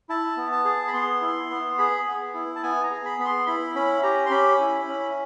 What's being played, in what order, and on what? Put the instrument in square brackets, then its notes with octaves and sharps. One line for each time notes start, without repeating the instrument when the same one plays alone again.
[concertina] E4 A5
B3
A5
G#4
B5
B3 C6
E4
B3
G#4 B5
B3
E4
A5
B3 G#5
A#5
G#4
B5
B3 B5
C6
E4 B5
C#4 B5
G4 A#5
C6
C#4 B5
E4
C#4